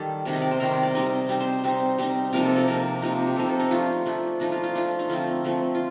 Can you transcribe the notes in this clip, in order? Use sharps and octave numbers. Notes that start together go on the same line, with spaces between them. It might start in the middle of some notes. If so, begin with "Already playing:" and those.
Already playing: D#3 G3 G4 A4
C3 D#3 G3
D#5
D5
C5
C3 D#3 G3 A#4
C5
D5
G3 C4 D#4 D#5
G3 C4 D#4
C5
G3 C4 D#4
G3 C4 D#4
C3 F3 A#3 D#4 A#4
A4
A4
C3 F3 A#3 D#4 A#4
C3 F3 A#3 D#4
G4
C3 F3 A#3 D#4 A4
A4
D#4
F3 A3 D4 F4
F3 A3 D4
F3 A3 D4 D#4
F4
F4
F3 A3 D4
D#4
D3 F3 A3 C4 F4
D3 F3 A3 C4
F4